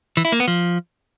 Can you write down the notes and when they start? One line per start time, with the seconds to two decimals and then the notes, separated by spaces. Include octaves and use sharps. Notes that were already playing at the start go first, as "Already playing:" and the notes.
0.17 E3
0.25 E4
0.32 A#3
0.40 B3
0.48 F3